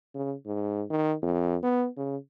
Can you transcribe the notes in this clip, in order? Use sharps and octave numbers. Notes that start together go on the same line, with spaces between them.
C#3
G#2
D#3
F2
B3
C#3